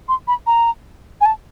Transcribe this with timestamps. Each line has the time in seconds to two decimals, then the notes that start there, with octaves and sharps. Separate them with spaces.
0.09 C6
0.28 B5
0.47 A#5
1.21 G#5
1.26 A5